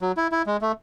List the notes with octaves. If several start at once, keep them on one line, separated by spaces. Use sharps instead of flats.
F#3
E4
E4
G#3
A3